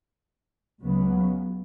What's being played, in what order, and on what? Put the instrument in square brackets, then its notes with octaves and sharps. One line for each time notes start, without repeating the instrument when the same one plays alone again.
[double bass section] C#2 C#3 F#3 B3